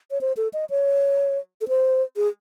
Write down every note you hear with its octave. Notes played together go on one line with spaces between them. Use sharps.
C#5
C5
A4
D#5
C#5
A4
C5
G#4